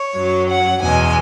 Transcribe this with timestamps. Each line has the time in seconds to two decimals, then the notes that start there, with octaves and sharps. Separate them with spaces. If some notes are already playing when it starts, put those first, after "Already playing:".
Already playing: C#5
0.16 F#2 F#3
0.49 F#5
0.81 E2 B2 G#3 G#5